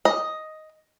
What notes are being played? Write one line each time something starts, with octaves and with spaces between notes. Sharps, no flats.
D#5